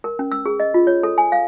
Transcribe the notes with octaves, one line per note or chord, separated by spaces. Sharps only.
A#4
C#4
E6
G#4
D#5
F4
C#5
A4
G#5
F5